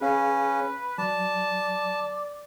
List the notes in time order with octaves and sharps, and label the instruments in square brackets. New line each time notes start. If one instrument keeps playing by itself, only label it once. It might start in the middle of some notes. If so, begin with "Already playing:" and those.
[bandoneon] C#4 [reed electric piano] G#4 F5 [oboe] B4
[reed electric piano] F#3 [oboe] D5 [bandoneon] A5